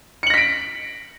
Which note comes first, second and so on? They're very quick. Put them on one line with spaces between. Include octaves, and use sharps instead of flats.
C#7 F#7 A#6 B6 D7